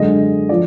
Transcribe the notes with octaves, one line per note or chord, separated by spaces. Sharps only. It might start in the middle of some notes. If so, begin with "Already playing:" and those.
Already playing: F#2 D3 G#3 D#5
F3 D5